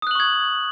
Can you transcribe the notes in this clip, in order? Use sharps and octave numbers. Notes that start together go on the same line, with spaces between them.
C#6 D#6 F#6 G#6 F#7